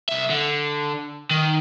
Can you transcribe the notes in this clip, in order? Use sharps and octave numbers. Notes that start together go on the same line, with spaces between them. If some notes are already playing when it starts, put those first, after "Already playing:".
C2 E5
D3
D#3